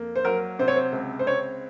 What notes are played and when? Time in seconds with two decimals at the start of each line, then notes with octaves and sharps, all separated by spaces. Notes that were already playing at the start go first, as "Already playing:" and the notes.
Already playing: F2 A#3
0.16 C5
0.25 F#3 A#4
0.59 C3 C5
0.68 C#5
0.76 C5
0.93 C#2
1.19 C5
1.27 C4 C#5